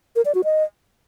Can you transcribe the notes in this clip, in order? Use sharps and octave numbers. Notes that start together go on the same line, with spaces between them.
A#4
D5
F#4
D#5